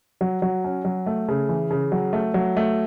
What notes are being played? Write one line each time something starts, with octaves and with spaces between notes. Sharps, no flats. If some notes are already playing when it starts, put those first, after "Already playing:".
F#3
F#3
C#4
F#3
A3
C#3
E3
C#3
F#3
A3
F#3
A3